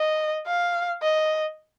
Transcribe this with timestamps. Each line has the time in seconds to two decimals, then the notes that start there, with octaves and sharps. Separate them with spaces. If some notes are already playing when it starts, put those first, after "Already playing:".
Already playing: D#5
0.47 F5
1.02 D#5